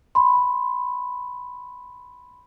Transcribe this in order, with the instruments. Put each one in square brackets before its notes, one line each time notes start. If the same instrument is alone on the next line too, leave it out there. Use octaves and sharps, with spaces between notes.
[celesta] B5 C6